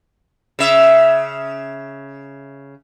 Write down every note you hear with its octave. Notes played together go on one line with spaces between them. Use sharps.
C#3 E5